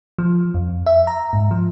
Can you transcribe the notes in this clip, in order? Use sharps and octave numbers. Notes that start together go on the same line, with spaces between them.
F3
F2
E5
A#5
G#2
F3